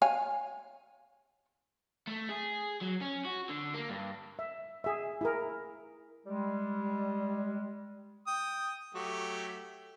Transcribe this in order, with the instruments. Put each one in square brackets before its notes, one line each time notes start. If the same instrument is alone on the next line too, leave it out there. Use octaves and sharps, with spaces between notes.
[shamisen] C#5 F5 G#5
[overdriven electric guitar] A3
G#4
F#3
C#4
F#4
D3
A#3
G2
[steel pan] E5
G#4 E5
E4 G#4 A#4
[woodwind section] G3 G#3
[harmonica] G5 D#6
F#3 A3 G4